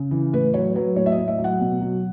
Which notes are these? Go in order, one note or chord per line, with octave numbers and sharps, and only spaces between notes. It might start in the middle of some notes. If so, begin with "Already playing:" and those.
Already playing: C#3
E3
A2 B4
F#3 C#5
F#3 B4
A2 C#5
E5
D#5
A2
E5
F#3
F#5
B2
F#3